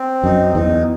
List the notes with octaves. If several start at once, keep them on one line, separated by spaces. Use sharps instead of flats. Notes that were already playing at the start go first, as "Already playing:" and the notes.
Already playing: C4
F#2 D#4
E2 D#4